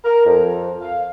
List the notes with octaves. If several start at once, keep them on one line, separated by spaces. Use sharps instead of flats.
A#4
F2
F5